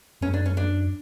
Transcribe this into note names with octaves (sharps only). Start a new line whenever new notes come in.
F#2 C#4
D4
C#4
D4